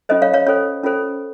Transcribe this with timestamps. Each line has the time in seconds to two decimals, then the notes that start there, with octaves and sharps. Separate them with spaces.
0.09 C#4 F4 A4 C5 D#5
0.22 C#5 F5
0.33 C#5 F5
0.46 C#4 F4 A4 C5 C#5
0.84 C#4 F4 A4 C5